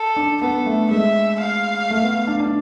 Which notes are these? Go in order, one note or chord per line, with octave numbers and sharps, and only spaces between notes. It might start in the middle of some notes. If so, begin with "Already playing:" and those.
Already playing: A4
D4
B3 A4
A3
G#3 E5
F5
A3
B3
D4
D4